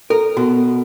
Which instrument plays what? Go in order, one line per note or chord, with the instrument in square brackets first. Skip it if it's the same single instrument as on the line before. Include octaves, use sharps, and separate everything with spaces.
[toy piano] A4 [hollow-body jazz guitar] A#4
[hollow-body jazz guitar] B2 [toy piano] F#4